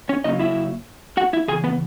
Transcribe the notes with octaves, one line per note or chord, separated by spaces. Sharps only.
C#4 C#5
C#3 F#3 A#3 C#4 D#4 D#5
E4 E5
F#4 F#5
E4 E5
E2 C#3 G#4 G#5
B3 B4